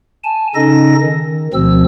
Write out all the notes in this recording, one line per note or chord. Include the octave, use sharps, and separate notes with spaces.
G#5 A5
C#3 C#4 D#4 A4 D#5 A#6
D#3
D2 B2 F3 C4 E6